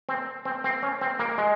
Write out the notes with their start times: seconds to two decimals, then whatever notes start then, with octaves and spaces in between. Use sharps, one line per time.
0.09 C4
0.45 C4
0.64 C4
0.83 C#4
1.01 C4
1.19 A#3
1.38 G#3